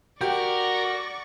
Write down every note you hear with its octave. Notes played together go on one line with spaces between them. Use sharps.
F#4 G4 A#4 D5 C#6